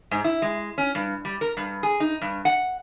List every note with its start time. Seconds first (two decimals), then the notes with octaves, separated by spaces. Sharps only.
0.11 G#2
0.24 E4
0.42 G#3
0.78 C#4
0.95 G2
1.25 G3
1.41 A#4
1.57 G2
1.83 G#4
2.00 D#4
2.21 G2
2.45 F#5